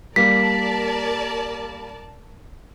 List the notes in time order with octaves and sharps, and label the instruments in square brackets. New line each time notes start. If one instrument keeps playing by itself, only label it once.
[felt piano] G3 A#3 [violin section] A#4 D5 A5 [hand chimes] B6